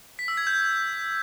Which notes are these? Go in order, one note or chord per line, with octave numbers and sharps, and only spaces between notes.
B6
E6
G#6
G6